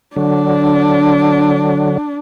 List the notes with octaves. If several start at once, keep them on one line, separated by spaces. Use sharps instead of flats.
D3 F#3 D4